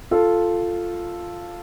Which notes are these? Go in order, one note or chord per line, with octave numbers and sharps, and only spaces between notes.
F4 A4